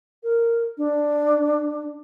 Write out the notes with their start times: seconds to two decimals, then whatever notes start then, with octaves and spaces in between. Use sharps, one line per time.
0.23 A#4
0.78 D4